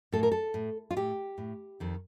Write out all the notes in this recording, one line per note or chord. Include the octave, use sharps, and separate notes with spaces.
A2 A4
A#4
A4
A2
F4
A2 G4
A2
F2 D#3